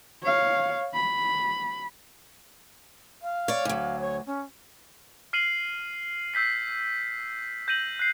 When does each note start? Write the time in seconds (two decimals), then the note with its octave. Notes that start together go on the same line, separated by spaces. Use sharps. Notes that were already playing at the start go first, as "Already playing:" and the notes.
0.23 C#5 F5
0.94 B5
3.22 F5
3.48 C#5 D5
3.65 D2 F#3
4.00 C#5
4.26 C#4
5.33 F6 C7 D#7 F#7
6.34 E6 G6 B6 C7
7.68 G6 A#6 D#7 F#7
7.99 F#6 C7